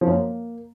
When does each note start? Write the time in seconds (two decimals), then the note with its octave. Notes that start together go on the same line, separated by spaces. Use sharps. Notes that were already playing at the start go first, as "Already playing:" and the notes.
0.01 F3
0.06 F#2
0.12 A#3